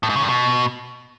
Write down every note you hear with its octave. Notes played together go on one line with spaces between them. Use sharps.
A2
G#2
C#3
G2
B2